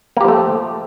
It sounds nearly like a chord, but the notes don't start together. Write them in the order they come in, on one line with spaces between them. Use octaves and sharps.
A#3 G4 F3 A3